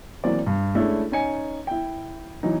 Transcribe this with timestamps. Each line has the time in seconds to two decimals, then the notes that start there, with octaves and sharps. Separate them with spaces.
0.24 E3 F#3 A#3 C4 D5
0.46 G2
0.75 G#3 A3 C#4 D4 E4 A4
1.12 C#4 D#4 G#5 C#7
1.67 E4 G5
2.43 E3 F#3 B3 D#4